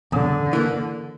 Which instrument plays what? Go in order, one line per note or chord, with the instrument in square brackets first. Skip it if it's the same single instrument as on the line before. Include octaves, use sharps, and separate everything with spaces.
[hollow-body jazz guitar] E2 [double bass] D3
[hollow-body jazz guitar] E3 A#3